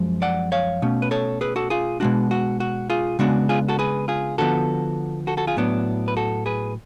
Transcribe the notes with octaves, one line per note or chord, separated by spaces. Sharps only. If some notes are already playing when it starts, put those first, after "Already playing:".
Already playing: F#2 F3 G#3
D5 F#5
C#5 F5
B2 A3 C#4
B4
A4 C#5
G#4 B4
F#4 A4
F4 G#4
B2 G#3 D4 F#4
F#4
F#4
F4 G#4
C#3 G#3 B3 D4 F#4
F4 G#4
F#4 A4
G#4 B4
F4 G#4
D3 F3 B3 F#4 A4
F#4 A4
F#4 A4
F4 G#4
A2 F#3 B3 D4
B4
F#4 A4
G#4 B4